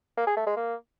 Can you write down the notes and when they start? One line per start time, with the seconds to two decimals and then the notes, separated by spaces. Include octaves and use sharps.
0.17 A#3
0.27 G#4
0.37 A3
0.47 G#3
0.57 A#3